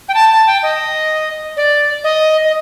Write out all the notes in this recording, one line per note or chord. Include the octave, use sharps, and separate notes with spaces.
G5
A5
A5
G5
D#5
D5
D#5
D#5